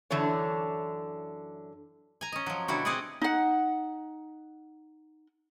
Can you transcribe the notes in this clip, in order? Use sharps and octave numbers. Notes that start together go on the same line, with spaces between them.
F#2 D3 E3 D4 C#5
G#5 A#5
C#4 D#5
F3 F#3
B2 D3 G3 E4 F#4
C4 G#4 D5 D#5 F#5
D#4 F#5